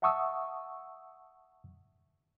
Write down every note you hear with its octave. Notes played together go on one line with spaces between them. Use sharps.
E5 F#5 A5 C#6 D#6 E6